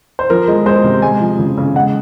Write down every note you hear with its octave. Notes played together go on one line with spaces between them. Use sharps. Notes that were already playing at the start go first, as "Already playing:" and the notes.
C5
F3 A#4
G#3
G#3 C5
C3
G#3 G#5
F3
C#3
C#3
G#3 F#5